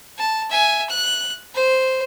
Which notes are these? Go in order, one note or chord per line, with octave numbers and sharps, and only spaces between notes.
A5
E5 G#5
F#6
C5